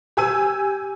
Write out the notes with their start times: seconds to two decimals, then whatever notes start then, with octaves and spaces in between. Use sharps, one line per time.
0.17 G4 G#5 E6 D#7